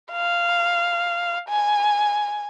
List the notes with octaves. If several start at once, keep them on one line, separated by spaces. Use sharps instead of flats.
F5
G#5